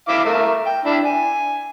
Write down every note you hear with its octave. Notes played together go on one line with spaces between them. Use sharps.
E4 F5 D6
A3 A#4 E5
G5
D4 E4
G#5